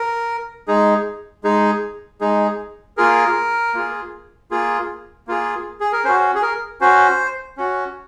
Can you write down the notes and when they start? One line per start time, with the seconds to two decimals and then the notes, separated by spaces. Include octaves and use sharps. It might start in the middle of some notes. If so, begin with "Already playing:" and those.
Already playing: A#4
0.68 G#3 D#4 G#4
1.44 G#3 D#4 G#4
2.21 G#3 D#4 G#4
2.97 A#3 F4 G#4 A#4
3.74 A#3 F4 G#4
4.51 A#3 F4 G#4
5.27 A#3 F4 G#4
5.80 G#4
5.93 A#4
6.04 C#4 F#4 C5
6.35 G#4
6.42 A#4
6.81 C#4 F#4 C5
7.58 C#4 F#4